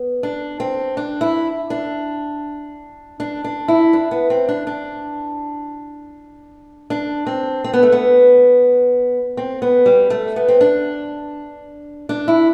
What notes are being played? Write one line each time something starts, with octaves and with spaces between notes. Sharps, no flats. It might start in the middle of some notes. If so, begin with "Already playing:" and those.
Already playing: B3
D4
C4
D4
E4
D4
D4
D4
E4
D4
B3
C4
D4
D4
D4
C4
C4
B3
A3
B3
C4
B3
G3
A3
B3
C4
D4
D4
E4